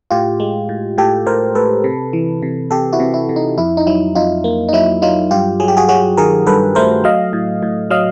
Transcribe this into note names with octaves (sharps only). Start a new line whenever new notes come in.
A2 F4 G4
G#3
A2
A2 G4 A4
A2 A#4 C5
A2 A4 B4
C3
E3
C3
C3 G4 A4
E4 F#4
C3
E4
C3
D#4
F2 E4
D#4
F#3 E4
F2 D#4 F4
A#3
D#4
F#3 E4
F#3 D#4 F4
G2 F4 G4
F#3 G#4
G4
F#4 G#4
F#3 F#4 G#4
D#3 G#4 A#4
G2 A4 B4
A3 A#4 C5
F#3 D#5 F5
A2
A2
F#3 D#5 F5